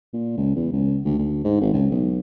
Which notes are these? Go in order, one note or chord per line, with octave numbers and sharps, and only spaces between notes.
A#2
C#2
E2
C#2
D2
D2
G#2
G#1
C#2
B1